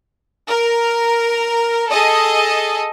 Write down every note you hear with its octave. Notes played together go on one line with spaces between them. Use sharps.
A#4
G#4 A4 D#5